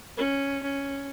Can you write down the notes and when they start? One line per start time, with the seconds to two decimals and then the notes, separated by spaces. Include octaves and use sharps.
0.17 C#4
0.63 C#4